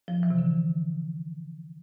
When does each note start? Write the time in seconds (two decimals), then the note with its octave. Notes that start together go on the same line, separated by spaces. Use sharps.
0.08 F3
0.23 E3
0.30 C3
0.38 D3